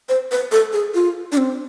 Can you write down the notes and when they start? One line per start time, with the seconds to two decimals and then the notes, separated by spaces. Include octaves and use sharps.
0.09 C5
0.31 B4
0.52 A4
0.73 G#4
0.94 F4
1.32 D4
1.37 C4